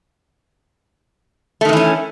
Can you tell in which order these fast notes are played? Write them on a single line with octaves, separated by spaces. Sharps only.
A3 D#3 C3 E3 C#4